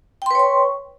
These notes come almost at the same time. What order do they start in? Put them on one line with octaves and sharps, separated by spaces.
G5 C6 B4 C#5 C#6